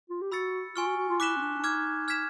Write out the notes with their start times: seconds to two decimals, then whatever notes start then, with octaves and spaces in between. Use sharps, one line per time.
0.10 F4
0.21 G4
0.32 F#4 B5 E6 A6 C#7
0.76 F4 G#5 C#6 F6
0.86 F#4
0.97 F#4
1.09 F4
1.20 E4 D6 F#6 B6 E7 G7
1.36 C#4
1.41 D4
1.59 D4
1.64 D#4 D6 F6 G#6
2.08 F6 G#6 B6 E7